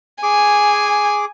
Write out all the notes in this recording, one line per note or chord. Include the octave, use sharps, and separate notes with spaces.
G#4 G#5 D6